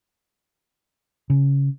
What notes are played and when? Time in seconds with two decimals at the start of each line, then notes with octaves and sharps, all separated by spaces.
1.30 C#3